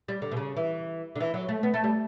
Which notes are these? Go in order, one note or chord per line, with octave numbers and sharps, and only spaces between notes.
G3
D3
B2
C#3
E3
D3
E3
F#3
A3
B3
A3
G3